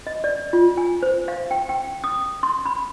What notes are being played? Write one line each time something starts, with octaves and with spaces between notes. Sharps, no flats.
D#5
D5
F4
G#5
C5
F5
G5
G5
D#6
C6
B5